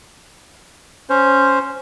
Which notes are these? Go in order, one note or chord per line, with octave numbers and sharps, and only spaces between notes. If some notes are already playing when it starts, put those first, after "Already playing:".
C#4 C5